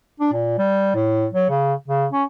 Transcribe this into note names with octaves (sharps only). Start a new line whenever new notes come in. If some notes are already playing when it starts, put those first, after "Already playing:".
D4
A#2
G3
A2
F#3
C#3
C#3
C#4